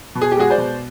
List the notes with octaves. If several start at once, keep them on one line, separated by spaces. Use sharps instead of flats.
B2
G#4
G4
G#3 F#4 G#4
C5 D5
B2